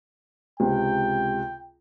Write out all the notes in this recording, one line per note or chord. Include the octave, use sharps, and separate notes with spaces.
C#2 C3 G5